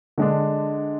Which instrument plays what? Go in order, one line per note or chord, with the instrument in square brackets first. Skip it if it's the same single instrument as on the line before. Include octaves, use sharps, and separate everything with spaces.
[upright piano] D3 G#3 D4